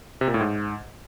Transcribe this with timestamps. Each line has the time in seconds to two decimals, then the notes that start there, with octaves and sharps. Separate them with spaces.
0.21 C3
0.28 A#2
0.34 A2
0.41 G#2